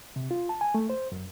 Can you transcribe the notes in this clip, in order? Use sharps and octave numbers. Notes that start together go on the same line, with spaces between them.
C3
F4
A5
G#5
A3
C5
F#2